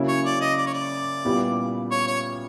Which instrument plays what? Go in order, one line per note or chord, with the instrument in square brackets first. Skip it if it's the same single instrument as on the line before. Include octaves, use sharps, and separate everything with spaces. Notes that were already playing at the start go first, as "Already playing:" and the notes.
Already playing: [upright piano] C#3 F#3 A#3 C#4 E4
[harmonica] C#5
D5
D#5
D5
C#5
D5
[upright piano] A#2 G3 B3 E4 G4
[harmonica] C#5
C#5